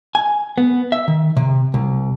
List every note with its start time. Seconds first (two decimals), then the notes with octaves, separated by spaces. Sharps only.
0.15 G#5
0.58 B3
0.92 E5
1.08 D#3
1.37 C3
1.74 C2